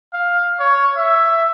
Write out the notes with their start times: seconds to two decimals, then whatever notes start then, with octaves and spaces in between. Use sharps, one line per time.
0.14 F5
0.60 C#5
0.96 E5